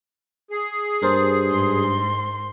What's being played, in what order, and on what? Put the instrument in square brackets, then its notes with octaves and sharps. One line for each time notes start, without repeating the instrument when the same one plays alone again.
[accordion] G#4
[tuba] G2 [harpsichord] A#4 C5 A5
[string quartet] G#2 C6